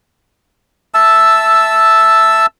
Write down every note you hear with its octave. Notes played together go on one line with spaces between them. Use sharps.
E5 A5 E6